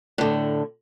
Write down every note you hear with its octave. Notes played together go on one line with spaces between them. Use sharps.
A2 D3